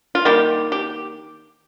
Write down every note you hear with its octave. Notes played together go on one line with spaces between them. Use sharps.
F4
D#3 G3 A#3 G4
G4